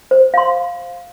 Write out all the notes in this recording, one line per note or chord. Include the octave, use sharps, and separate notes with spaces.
C5
F5 C6